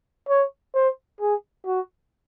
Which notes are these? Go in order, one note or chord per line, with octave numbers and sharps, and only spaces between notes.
C#5
C5
G#4
F#4